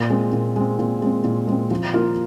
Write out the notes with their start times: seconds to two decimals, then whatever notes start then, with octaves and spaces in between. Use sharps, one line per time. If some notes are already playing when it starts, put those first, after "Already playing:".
Already playing: A#2
0.10 G#3 C4
0.33 A#2
0.56 G#3 C4
0.79 A#2
1.02 G#3 C4
1.24 A#2
1.47 G#3 C4
1.71 F3
1.93 A#3 F4 A#4